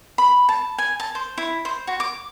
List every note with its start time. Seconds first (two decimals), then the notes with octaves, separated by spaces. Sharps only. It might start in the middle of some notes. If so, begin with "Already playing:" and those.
0.18 B5
0.49 A5
0.78 G#5
1.00 A5
1.15 C5
1.38 E4
1.65 C5
1.87 F#4
2.00 D6